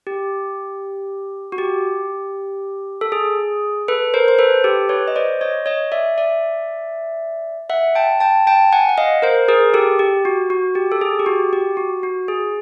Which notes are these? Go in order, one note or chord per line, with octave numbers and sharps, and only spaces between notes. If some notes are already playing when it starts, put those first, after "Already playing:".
G4
F#4
G4
A4
G#4
A4 B4
A#4 C5
C5
A4 B4
G4 A4
B4 C#5
D#5
C5 D5
C#5 D#5
C#5 D#5
D5 E5
D5 E5
E5 F#5
G5 A5
G5 A5
G5 A5
F#5 G#5
F#5
D#5 F5
A#4 C5
G#4 A#4
G4 A4
G4
F#4
F#4
G4
A4
G#4
G4
F#4
G4
F#4
F#4
G#4